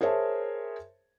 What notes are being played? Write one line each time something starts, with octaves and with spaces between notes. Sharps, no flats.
G#4 A#4 C5 C#5 E5 A5